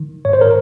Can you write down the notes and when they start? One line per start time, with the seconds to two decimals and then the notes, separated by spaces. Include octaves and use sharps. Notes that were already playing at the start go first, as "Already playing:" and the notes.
Already playing: D#3
0.25 G#2 C#5
0.33 C5
0.41 A#4